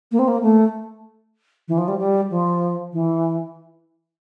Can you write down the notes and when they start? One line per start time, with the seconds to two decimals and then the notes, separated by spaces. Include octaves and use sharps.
0.12 A#3
0.19 C4
0.28 A#3
0.42 A3
1.68 E3
1.78 F3
1.88 G3
1.99 G3
2.30 F3
2.93 E3